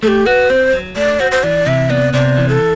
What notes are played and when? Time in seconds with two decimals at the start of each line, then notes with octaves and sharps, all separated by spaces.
0.03 A3 A4
0.08 G4
0.26 F#4 B4
0.50 C4 C5
0.73 F#3
0.96 A3 D5
1.20 F#4 C5
1.32 C5
1.43 E3 D5
1.66 C3 E5
1.90 B3 D5
2.13 C3 D5
2.37 E3
2.49 A4